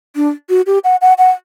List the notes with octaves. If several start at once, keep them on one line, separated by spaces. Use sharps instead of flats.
D4
F#4
G4
F#5
F#5
F#5